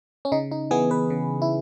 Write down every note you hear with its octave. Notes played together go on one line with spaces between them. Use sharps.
C#4
C#3 D#4
D#4
E3 B3 G#4
B4
C#3
E4